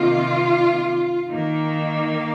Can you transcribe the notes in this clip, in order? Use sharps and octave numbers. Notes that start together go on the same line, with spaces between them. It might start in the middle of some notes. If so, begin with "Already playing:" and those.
Already playing: C3 D#3 A#3 F4
D#3 A#3